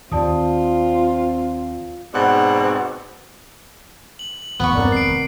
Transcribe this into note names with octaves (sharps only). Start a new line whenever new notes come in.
D#2 C4 F4 D5 A5 D#6
G#2 B2 C4 D5 F#5
F#7
F1 E2 D3 B3 C#6
E2 G2 C4 D4 A#4 D5
F1 D#3 C7 D7